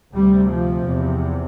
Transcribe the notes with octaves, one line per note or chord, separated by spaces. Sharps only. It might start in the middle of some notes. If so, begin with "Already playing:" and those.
D2 C3 G3
F3
E2 C3